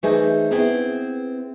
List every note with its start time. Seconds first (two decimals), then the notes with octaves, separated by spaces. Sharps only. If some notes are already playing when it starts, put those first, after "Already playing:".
0.03 E3 A3 D#4 G#4 C5 D#5
0.51 B3 C4 E4 G#4